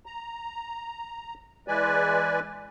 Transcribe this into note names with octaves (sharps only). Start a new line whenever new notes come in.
A#5
E3 G#3 B4 D5 G#5